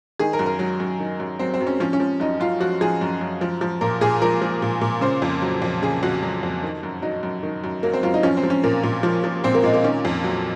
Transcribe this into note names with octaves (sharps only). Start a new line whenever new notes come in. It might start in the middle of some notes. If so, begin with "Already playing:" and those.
D#3 G#4
A#4
F#2
A#4
F#3
F#2
D#3
F#2
F#3 C4
C4
F#2
C#4
F3 C#4
C#4
F3
F#2 D#4
F#2 F4
F3 F#4
F3 G#4
F#2
F#2
F3
F3
A#2 A#4
A#2 G#4
F3 A#4
F3
A#2
A#2
C#3 C5
F2
F#3
F2
C#3 G#4
F2 F#4
F#3
F2
D#3
F#2
F#3 D#4
F#2
D#3
F#2
F#3 A#3
C4
F#2 F4
D#4
F3 C#4
C4
F3
C#4
A#2 A#3
A#2
F3
F3
A#2 C4
A#3
A#2 G#3
A#3
D#3 C#4
F2
F#3